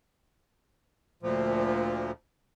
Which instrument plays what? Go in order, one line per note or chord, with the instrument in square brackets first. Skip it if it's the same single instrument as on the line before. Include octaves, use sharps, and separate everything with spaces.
[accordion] D2 A#2 F3